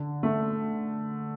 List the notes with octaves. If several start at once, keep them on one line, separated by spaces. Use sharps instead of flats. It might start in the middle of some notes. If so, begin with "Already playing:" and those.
Already playing: D3
A3